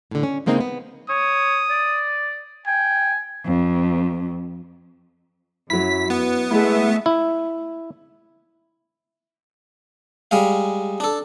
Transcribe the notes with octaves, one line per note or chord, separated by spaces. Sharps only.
A2 D3
C#4
C#3 G#3 A#3 C4 D#4
B3
C#5 D#6
D5
G5 G#5
F2
F#2 F#3 E4 B6
B3
G#3 A3 E4 G#4 E5
E4
G3 G#3 F5
D4 A4